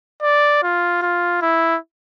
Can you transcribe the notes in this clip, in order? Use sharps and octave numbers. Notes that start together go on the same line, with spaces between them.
D5
F4
F4
E4